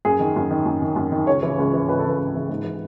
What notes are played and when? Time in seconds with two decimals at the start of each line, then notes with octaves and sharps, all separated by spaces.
0.05 F#2 G#4
0.20 D#3
0.36 F#2
0.51 D#3
0.66 F#2
0.82 D#3
0.96 F#2
1.12 D#3
1.27 C#2 C#5
1.43 C#3 E3
1.58 C#2
1.74 C#3 E3
1.88 C#2 B4
1.99 A4
2.04 C#3 E3 B4
2.19 C#2
2.35 C#3 E3
2.49 G#2
2.64 E3